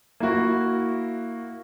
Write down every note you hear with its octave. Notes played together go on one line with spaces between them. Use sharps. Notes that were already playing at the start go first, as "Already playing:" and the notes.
A#3 E4 F#4